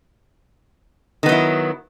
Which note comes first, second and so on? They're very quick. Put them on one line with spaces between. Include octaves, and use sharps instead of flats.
D#3 B3 F#3 E4